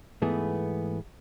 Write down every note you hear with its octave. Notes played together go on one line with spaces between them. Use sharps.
G#2 E3 A3 B3 G#4